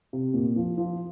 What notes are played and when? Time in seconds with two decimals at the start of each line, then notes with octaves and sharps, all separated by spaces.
0.13 C3
0.34 A#2
0.56 F3
0.78 F3